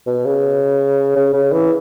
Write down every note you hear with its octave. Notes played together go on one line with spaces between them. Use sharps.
B2
C#3
C#3
C#3
E3